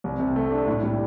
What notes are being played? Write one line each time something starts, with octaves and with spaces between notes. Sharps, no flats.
C2
C3
A3
D4
A2
G3